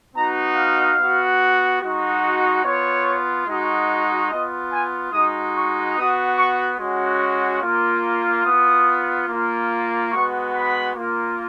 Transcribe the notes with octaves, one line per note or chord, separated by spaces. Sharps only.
B3 D#4 F#4 A#5
F5
B3 F#4
G#3 D#4 F#4
B3 F4 C#5
G#3 D#4 F#4
B3 F4 D#5
G#5
G#3 D#4 F#4 D#6
C#6
B3 F#4 D#6
C#6
G#3 C#4 F#4
A#3 F4
B3 F4 D#6
A#3 F4
G#3 B3 F#4 C#6
B5
A#3 F4